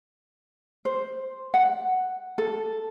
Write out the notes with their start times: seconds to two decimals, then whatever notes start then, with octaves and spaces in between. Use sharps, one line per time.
0.85 C5
1.54 F#5
2.38 A4